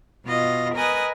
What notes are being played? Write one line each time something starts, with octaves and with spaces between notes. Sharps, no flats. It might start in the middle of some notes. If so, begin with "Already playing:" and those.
B2 F4 D#5
A#4 B4 D#5 G#5 D#6 F#6